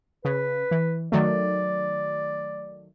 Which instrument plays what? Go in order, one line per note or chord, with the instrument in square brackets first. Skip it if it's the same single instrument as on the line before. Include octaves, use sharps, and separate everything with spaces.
[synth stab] C#3 [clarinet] B4
[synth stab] E3
[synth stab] D#3 F#3 A3 [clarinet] D5